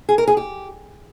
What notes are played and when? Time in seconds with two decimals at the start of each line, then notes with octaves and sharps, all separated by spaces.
0.09 G#4
0.18 A#4
0.27 G#4
0.37 G4